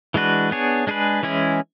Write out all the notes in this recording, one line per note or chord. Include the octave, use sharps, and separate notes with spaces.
E3 G#3 D4 F#4 B4
B3 D4 G#4 C#5
G#3 D4 G#4 B4
E3 G#3 C#4 E4 G#4